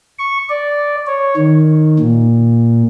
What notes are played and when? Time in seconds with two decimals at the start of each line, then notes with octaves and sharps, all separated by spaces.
0.19 C#6
0.49 D5
1.07 C#5
1.37 D#3
1.99 A#2